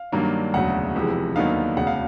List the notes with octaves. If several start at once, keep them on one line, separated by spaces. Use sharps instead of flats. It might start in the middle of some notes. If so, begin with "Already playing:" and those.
Already playing: F5
G2 D#3 F#3 A#3 D4
E1 D2 C#3 F#3 F#5
F1 F2 C3 E3 G#3
D#2 D3 F#3 B3 D#4 F5
E1 D2 C#3 F#5
F5